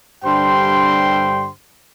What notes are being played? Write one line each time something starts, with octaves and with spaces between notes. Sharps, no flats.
G2 D3 G3 C5 G5 C6